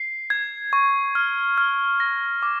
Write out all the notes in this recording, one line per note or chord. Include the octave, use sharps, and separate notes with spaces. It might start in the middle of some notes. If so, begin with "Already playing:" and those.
Already playing: C7
G#6
C#6
F6
F6
A#6
D6